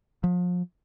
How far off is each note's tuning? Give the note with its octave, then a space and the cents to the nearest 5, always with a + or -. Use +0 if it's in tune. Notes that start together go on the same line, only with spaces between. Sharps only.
F3 +35